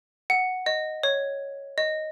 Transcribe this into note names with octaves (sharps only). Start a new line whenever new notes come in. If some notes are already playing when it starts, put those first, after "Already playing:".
F#5
D#5
C#5
D#5